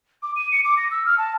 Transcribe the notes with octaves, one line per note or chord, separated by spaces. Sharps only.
D6
D#7
C#7
D6
A#6
E6
F6
A5